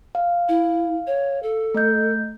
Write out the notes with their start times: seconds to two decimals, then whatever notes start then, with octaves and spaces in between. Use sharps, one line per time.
0.15 F5
0.49 E4
1.07 C#5
1.43 A4
1.74 A3 D#5 G6